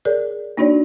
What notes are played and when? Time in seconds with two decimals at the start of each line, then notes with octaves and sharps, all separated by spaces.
0.05 G#4 A#4 C#5 D5
0.57 A#3 D4 D#4 F#4 C#5 D5